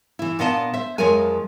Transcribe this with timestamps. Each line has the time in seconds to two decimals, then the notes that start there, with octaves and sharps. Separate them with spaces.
0.19 E3 E4
0.39 A#2 B3 D4 D#5 F5 A5
0.74 C5 E5
0.98 F2 F3 F#3 G#3 A#4 G#5